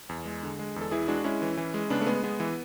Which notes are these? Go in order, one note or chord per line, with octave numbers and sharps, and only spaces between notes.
E2
G#3
D3
G#3
E2
A4
E3 E4 G#4
G#3 D4 F#4
G#3 C#4 E4
E3
E3
G#3
C#3 B3 D4
A3
G#3 B3
G#3 B3
E3